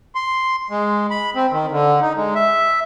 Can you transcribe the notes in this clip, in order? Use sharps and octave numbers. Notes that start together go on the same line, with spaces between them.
C6
G#3
B5
C4
D#3
D3
D#4
G#3
E5